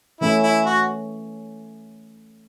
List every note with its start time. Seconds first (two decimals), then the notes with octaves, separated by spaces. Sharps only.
0.21 E3 A3 C#4 E4
0.43 E4
0.65 F#4